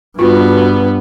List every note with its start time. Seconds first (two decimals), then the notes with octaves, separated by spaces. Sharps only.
0.19 G2 B3 F4 F#4